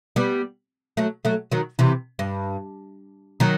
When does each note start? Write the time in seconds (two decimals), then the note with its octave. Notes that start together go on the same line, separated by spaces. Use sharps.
0.16 G3 B3
0.97 F#3 A3
1.25 F#3 A3
1.52 D#3 F#3
1.79 C3 E3
2.19 G2
3.40 D#3 F#3